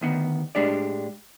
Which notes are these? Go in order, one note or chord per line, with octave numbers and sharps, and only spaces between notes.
D2 D#3 B3
A2 G#3 D4 G4 D5